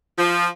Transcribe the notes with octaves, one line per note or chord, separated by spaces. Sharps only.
F3